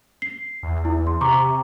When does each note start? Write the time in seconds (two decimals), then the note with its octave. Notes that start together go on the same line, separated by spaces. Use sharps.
0.22 C7
0.63 E2
0.85 E4
1.07 C6
1.21 C3 A#5 C#6 D6